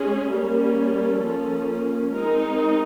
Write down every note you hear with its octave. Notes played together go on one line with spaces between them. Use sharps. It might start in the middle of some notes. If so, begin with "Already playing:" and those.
Already playing: G#3 C#4 G#4
G3 A#3 C#4
A4
F3 A#3 C#4
G#3 C4 D#4 A#4